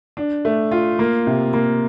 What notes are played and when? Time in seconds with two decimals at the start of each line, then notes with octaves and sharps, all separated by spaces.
0.17 D4
0.45 A3
0.71 F4
0.99 A#3
1.27 C3
1.53 A#3